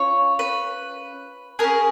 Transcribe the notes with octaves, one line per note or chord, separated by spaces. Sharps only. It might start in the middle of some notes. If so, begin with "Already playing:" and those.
Already playing: C#4 F4 C#5
B4
C#4 G#4 A#4